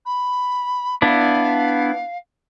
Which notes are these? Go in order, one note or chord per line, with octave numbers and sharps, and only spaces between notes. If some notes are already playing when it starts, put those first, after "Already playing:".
B5
B3 D4 E4 F5